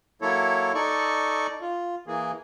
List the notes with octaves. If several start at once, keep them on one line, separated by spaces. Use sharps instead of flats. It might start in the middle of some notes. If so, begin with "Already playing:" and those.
F#3 A#3 E4 A4 C#5
D#4 A4 D5 C#6
F4
E3 A#3 G#4